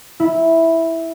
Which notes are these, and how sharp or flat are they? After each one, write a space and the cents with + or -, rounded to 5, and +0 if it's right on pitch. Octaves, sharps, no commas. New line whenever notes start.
E4 -5